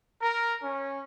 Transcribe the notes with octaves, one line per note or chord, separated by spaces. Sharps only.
A#4
C#4